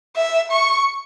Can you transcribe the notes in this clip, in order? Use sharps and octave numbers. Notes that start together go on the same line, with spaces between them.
E5
C#6